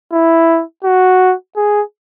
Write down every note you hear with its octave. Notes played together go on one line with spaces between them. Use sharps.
E4
F#4
G#4